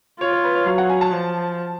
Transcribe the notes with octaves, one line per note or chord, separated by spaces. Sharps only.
F4 C#5
C#5
B4
C#5
F#3 F5
F#5
G#5
A5
F3